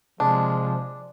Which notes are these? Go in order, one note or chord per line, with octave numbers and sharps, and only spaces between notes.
C3 F3 G#3 D4